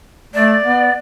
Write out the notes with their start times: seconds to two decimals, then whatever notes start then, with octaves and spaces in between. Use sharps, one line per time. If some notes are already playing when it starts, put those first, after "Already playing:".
0.34 A3 D5
0.63 B3